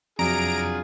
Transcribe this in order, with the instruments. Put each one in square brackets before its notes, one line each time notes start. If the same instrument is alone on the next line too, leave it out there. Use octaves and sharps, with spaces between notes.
[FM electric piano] F2 [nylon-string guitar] C3 F#3 D4 [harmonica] F4 G#4 [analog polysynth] A#5 D7